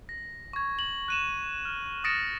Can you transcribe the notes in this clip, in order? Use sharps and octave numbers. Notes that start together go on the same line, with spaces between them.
A#6
C#6 G#6
F#7
F#6 D#7 E7
F6
D#6 A6 A#6 C#7 D7 E7